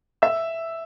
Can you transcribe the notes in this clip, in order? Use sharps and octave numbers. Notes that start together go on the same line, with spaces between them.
E5 E6